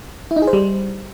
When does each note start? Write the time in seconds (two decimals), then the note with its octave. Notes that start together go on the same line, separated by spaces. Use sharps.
0.31 E4
0.36 D#4
0.42 G#4
0.48 C5
0.53 G3